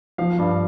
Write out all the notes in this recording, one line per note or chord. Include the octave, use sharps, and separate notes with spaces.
F3 F5
G2